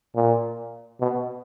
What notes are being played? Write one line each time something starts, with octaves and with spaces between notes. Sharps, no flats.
A#2
B2